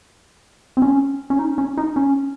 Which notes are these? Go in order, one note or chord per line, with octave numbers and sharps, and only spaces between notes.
C4
C#4
C#4
D#4
C#4
D#4
C#4